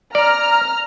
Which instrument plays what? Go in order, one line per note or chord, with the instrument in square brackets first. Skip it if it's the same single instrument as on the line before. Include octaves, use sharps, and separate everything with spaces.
[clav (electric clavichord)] D5 [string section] A#5 F6